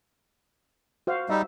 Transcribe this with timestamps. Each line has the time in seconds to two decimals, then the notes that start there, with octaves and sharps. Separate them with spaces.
1.07 F#4 C5 F5
1.30 G3 D#4 E5